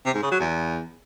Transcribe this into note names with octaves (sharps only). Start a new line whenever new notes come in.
C3
G#2
C#3
F#3
E2